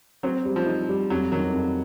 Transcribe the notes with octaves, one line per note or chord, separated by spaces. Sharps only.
F#3 C4
G3
F3
D#4
G3
F2 F#3
D#3 F#3
F2